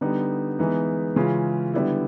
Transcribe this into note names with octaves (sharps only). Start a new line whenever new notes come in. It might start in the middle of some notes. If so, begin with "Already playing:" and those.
D3 G3 B3 D#4
E3 G#3 B3 D#4
C#3 E3 G#3 C#4 F4
D3 G3 B3 E4